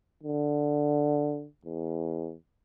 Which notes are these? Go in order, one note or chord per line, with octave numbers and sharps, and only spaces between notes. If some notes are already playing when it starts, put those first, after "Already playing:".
D3
E2